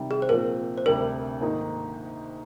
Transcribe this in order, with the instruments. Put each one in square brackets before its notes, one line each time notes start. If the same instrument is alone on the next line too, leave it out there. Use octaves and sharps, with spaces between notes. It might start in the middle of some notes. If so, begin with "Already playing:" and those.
Already playing: [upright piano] C3 D#3 G3
[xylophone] G#4
C5
[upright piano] A#2 F3 C4 [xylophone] A#4
[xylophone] C5
[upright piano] D2 C3 G3 D4 [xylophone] A#4
[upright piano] G#2 D#3 A#3 D#4